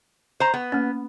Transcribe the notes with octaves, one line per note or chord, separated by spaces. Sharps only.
C5 A#5
B3
A#3 C#4